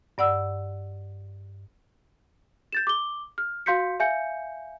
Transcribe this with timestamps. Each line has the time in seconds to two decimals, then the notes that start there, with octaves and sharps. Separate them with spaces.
0.18 G2 D5 F#5 E6
2.72 G6 A6 E7
2.87 D6 G7
3.38 F6
3.66 F#4 F5 C6 G6 B6 C#7
4.00 E5 F5 G#5 G6 C#7